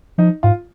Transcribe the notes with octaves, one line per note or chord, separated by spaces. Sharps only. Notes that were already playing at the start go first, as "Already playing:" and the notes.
F3 D#4
G#2 F4